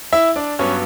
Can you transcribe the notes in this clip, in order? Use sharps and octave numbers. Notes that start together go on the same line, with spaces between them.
E4 E5
D4 D5
G2 F#3 B3 C#4 C#5